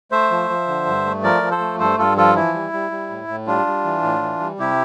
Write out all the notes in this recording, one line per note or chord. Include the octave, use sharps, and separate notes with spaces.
A3 C5 E5
F3
F3
D3
G2
A3
F3 A#4 D5
F3
A4 C5
A3
G2 A4 C5
G2 F4 A4
F3 F4 A4
E3 E4
G3
G3
G3
A2
A2
G3 D4 F4
G3
E3
A2
E3
G3
C3 E4 G4